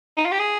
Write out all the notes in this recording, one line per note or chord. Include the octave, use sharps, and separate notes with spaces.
D#4
F4
G4
G#4